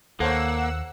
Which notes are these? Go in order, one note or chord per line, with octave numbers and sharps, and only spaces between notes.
D#2 A#3 A4 C5 C#5 F#5 E6